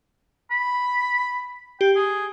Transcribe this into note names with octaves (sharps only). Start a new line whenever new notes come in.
B5
G4 G5
G#4